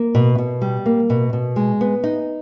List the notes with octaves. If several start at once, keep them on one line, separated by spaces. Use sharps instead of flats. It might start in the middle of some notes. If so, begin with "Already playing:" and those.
Already playing: A#3
B2
B2
G3
A#3
B2
B2
G#3
B3
D#4